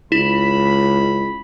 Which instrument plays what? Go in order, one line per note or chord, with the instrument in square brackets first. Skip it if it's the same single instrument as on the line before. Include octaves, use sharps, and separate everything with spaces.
[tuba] C#2 [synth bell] E4 [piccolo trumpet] B5